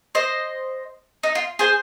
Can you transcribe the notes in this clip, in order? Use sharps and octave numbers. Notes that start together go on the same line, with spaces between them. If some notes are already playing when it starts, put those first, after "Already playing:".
C5 D#5
D#4
F4
G#4 C5